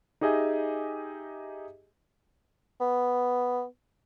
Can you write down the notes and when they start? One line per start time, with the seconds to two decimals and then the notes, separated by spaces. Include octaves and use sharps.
0.21 D#4 G4 G#4 D#5 E5 G#5
2.81 B3